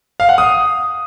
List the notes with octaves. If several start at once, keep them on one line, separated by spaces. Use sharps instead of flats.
F5
F#5
D#6